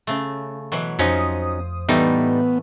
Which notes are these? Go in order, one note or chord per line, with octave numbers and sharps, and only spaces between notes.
C#3 A3
B2 E3 F#3
F2 F3 F#3 C#4 D#4 C5 D#6
A2 E3 G3 A3 B3 D#4